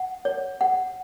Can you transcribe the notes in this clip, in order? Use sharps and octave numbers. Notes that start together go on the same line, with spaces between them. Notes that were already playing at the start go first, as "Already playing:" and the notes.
Already playing: F#5
C#5
F#5